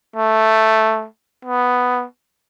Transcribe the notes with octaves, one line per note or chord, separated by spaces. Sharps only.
A3
B3